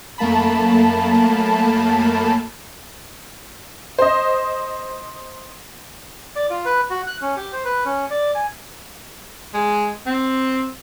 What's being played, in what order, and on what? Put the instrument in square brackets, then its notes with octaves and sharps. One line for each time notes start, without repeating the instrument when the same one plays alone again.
[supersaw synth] F#2 A3 A#3 A5 B5
[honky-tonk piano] C5 D#5
[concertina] D5
F4
B4
F#4
F#6
C#4
G4
C5
B4
C#4
D5
G#5
[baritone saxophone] G#3
C4